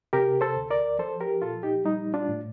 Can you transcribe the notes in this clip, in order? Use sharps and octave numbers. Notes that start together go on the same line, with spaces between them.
C3 G4 A#4
A4 C5
D2
A#4 D5
F3 A4 C5
G4 A#4
A#2 F4 A4
D#4 G4
G3 D#4
D4 F4
A2